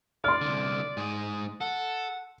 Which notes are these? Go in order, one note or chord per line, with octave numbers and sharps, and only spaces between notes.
D5 C6 F6
C2 D3
G#2 G#4
A4 F#5